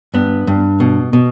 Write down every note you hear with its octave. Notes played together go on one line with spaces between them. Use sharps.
G2 B3
G2
B2
B2